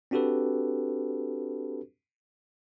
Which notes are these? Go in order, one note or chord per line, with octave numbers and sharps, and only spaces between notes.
C4 D4 F#4 G4 A4 B4